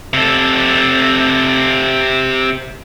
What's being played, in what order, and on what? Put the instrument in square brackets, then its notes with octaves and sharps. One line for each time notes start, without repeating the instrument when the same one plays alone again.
[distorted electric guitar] C3 A4